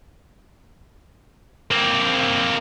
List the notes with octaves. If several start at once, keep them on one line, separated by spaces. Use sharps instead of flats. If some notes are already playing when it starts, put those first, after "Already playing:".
A#3 C4